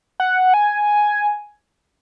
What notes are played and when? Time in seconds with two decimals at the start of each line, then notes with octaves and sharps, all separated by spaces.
0.20 F#5
0.54 G#5